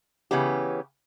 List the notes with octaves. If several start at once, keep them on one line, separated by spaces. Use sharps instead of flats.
C#3 E3 B3 C#4 G4